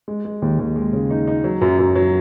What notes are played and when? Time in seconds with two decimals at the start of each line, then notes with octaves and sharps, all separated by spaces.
0.08 G#3
0.25 G#3
0.42 D#2
0.59 D#2
0.76 G#3
0.93 C#3
1.11 D#4
1.27 D#4
1.44 F#3
1.61 F#2
1.79 F#2
1.95 F#3